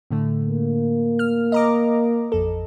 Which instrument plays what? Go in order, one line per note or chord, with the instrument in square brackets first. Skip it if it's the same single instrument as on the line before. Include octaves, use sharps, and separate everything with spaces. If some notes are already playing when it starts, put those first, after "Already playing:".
[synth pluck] A2 D3 A3
[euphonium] A#3
[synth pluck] F6
D#5 A#5 D6
A1 F2 A4